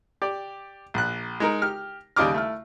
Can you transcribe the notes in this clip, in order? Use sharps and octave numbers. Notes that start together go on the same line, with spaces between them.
G4 D5
A#1 F#6
G#3 D#4 A#4
G4 F6
D#2 C#3 G3 D#5 D6 F6
A3 E4 F6